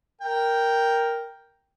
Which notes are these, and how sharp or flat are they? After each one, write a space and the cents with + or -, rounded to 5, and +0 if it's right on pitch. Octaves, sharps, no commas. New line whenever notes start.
A#4 +0 G5 +0